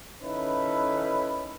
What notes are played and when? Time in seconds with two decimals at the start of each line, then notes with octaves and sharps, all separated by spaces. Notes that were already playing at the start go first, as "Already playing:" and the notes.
0.23 D#3 C#4 D#4 E4 A4 B4